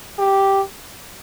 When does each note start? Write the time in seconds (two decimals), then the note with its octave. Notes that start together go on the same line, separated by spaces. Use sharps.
0.19 G4